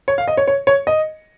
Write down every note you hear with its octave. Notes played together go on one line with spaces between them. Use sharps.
C#5
F5
D#5
C#5
C#5
C#5
D#5